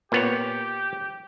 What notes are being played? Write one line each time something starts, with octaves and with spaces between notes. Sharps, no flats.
A#2 B3 G4 C#5